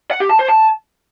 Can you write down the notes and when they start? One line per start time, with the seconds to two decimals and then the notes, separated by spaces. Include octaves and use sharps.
0.11 F#5
0.20 G4
0.30 A5
0.39 C5
0.48 A5